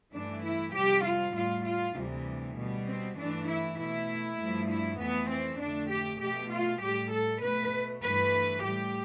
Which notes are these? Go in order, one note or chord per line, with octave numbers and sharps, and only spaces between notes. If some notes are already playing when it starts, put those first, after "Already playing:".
G2 E3 A3 D4
E4
F2 C3 G3 G4
F4
A2 G3 F4
F4
D2 C3 E3 G3
B2 G3
C4
G2 E3 A3 D4
E4
B2 A3 E4
G2 F3 A3
E4
F2 E3 A3 B3
C4
F2 D3 A3 D4
G4
B2 A3 G4
F4
A2 G3 G4
A4
B2 A3 B4
G2 E3 A3 B4
A2 G3 G4